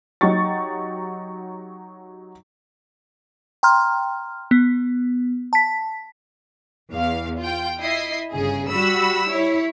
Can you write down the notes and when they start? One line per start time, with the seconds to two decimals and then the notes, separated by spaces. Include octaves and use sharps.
0.21 F#3 D#4 G4 C#6 A6
3.63 G5 A#5 C6 F6
4.51 B3
5.53 A5 B6
6.92 E2 F5
7.39 F4 G5
7.79 E4 D#5 E5 C7
8.33 G1 C#3 G#4
8.70 G3 F#4 B5 E6
9.29 E4 C#5